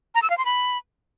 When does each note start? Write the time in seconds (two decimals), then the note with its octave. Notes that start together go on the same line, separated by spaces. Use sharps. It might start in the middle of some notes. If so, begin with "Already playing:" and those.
0.15 A#5
0.22 E6
0.30 F5
0.38 C6
0.45 B5